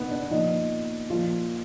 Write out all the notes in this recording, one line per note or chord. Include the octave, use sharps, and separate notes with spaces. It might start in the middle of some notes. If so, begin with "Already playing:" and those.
Already playing: B2 B3 D#4
D4
A#2 F3 D#4
A#2 F3 F4